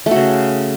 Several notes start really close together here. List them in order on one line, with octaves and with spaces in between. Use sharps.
A3 F#4 C#3